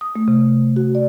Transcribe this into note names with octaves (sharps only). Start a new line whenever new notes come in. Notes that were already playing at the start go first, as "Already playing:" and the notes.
D#6
A3
C3
F#4
D5